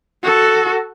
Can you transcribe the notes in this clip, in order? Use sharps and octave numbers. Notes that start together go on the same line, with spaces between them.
F#4 A4